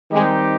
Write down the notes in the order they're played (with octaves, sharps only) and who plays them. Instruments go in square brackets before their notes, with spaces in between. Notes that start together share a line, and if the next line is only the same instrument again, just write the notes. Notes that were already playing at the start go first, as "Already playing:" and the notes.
[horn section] D#3 G3 C4 D#4 G4 [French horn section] G#3